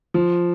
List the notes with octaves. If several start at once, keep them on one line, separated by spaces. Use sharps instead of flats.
F3